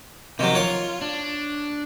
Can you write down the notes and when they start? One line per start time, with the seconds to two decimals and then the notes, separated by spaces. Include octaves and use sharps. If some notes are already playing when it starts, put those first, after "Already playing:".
0.39 C3 D#3 F#3
0.55 F4 C#5
1.02 D4